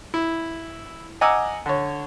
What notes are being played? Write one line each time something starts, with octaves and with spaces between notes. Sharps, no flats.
E4
D#5 F#5 G#5 A#5 D6 E6
D3 C#5